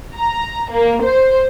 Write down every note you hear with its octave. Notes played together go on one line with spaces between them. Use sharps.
A#5
A#3
C5